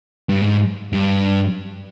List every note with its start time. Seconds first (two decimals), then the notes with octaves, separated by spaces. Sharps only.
0.29 G2
0.41 G#2
0.93 G2